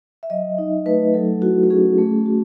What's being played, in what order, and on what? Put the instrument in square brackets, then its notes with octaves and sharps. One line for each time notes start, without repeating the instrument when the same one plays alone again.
[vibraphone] E5
F#3 D#5
D#4
A3 B4
F#3 A4
E4 F#4
F#4
C#4 G#4
A3
F#4